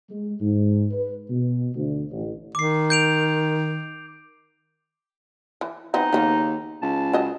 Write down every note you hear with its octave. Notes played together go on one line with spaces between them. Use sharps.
G#3
G#2
B4
B2
D2
A1
D#3 D6 C7
G6 D7 F7
E3
E3 B3 C4 D#4
D#2 C#3 G3 B3
C#2 A5
F#3 D#5